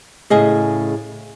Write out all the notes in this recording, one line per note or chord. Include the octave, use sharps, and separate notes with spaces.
A2 C#3 G#4 D#5